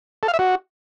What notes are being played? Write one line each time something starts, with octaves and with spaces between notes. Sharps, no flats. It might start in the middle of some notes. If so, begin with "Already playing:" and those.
A4
F5
E5
F#4